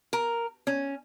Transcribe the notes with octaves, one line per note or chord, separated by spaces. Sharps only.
A#4
C#4